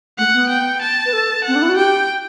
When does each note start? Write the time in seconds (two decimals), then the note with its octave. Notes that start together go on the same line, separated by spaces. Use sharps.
0.18 A3 F#5
0.34 B3
0.49 G5
0.81 A5
1.06 B4
1.13 A4
1.44 C4 F#5
1.55 D4
1.62 E4
1.69 F#4
1.76 G4 G5